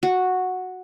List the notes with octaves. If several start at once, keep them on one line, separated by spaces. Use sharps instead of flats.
F#4